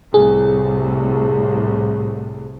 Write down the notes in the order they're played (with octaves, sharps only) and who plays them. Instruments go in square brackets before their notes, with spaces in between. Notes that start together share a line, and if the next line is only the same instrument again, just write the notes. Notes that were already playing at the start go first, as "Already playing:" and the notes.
[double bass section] C2 A2 [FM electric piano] G#4